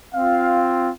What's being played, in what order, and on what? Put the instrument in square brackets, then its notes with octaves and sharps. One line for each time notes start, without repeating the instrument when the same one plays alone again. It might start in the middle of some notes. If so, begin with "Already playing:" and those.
[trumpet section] C4 F4 F5